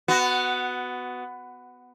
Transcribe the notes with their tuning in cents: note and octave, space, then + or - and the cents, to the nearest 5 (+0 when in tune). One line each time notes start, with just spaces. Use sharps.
B3 +15 F#4 +0